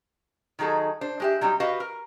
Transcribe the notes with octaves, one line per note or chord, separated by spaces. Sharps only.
D#3 F#3 D#4 G#4 A4
D4 C5
G#3 G4 E5
F#3 G3 C4 D#4
F#4 G4 B4 D#5 F5
A#4